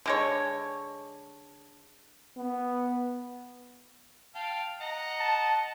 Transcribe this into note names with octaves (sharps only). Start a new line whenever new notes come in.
D3 G#3 C#5
B3
F5 G5 A5
D#5 F#5 A#5
A5